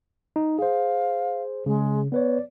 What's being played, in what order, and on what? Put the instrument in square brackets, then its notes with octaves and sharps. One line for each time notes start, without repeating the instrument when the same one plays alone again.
[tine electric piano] D#4
[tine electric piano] G#4 C5 [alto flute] F5
[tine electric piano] C#3 [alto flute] G#3
[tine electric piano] B3 B4 C#5 [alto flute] D5